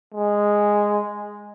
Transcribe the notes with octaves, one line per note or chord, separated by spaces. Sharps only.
G#3